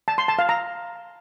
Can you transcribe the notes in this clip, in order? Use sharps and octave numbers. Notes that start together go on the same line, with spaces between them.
A5
C6
A5
F5
A#5